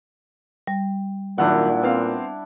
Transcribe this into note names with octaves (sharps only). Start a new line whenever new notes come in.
G3
G#1 A#2 D#3 F#3 D4 E4 F#5
B3 C4 F5